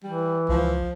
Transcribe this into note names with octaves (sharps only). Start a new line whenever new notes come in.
E3 G3
C#2 F3